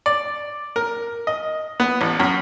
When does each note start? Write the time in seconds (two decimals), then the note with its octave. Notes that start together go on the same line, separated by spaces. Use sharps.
0.06 D5
0.76 A#4
1.27 D#5
1.80 B3
2.01 A1
2.20 F#2